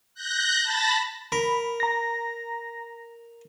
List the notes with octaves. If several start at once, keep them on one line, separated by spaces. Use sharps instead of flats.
F#6 G6 A#6
A5 B5 A6 A#6
A#4 B5
A#5 A#6